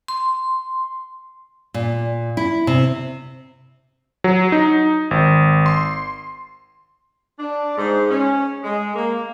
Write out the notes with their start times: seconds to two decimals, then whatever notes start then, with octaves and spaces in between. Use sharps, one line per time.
0.08 C6
1.74 A#2
2.37 E4
2.67 C3
4.24 F#3
4.52 D#4
5.11 G#1
5.66 C6
7.39 D4
7.77 G#2
8.11 C#4
8.64 G#3
8.96 A#3